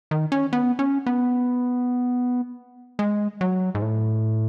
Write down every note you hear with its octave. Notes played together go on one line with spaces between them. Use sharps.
D#3
C#4
B3
C#4
B3
G#3
F#3
G#2
A2